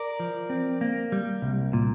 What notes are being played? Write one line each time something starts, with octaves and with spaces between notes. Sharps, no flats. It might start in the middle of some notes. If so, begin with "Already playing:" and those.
Already playing: A#4 D5
F3
C4
A#3
G3
C2
A#2